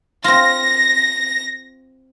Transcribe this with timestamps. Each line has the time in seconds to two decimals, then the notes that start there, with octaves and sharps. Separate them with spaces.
0.24 C4 F4 A#6